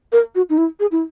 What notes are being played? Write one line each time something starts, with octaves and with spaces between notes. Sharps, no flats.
A#4
F#4
D#4
E4
G#4
E4